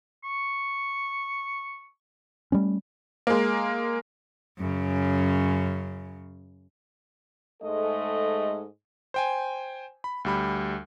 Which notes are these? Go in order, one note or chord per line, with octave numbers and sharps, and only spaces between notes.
C#6
G3 A3 C#4
G#3 A#3
F#2 C#3
G#2 G#3 A3 A4 D#5
C5 G5 G#5
B5
D2 G3 B5